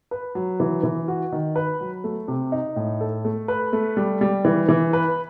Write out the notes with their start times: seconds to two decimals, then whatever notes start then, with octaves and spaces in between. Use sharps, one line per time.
0.11 B4
0.35 F#3
0.60 E3
0.83 E3
1.08 F#4
1.32 D#3
1.56 B4
1.81 F#3
2.04 A3
2.28 C3
2.52 D#4
2.76 A2
3.01 A4
3.25 A3
3.48 B4
3.73 A3
3.97 G3
4.21 G3
4.45 E3
4.69 E3
4.93 B4